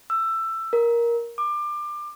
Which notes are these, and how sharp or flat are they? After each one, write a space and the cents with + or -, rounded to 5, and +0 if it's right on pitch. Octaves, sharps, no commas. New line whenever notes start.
E6 +15
A#4 +10
D6 +25